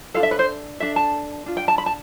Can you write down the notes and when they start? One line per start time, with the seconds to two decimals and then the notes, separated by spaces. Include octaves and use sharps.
0.14 F4 A4 F5
0.20 D4 E5
0.31 B4
0.39 C5
0.80 D4 A4 E5
0.96 A5
1.46 D4 F4
1.57 G5
1.68 A5
1.78 B5
1.86 A5